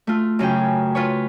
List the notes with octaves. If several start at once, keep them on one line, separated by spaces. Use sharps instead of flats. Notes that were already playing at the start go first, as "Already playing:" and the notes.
A3 F4
F#2 C#3 C#4 G5
F4 B4 C#5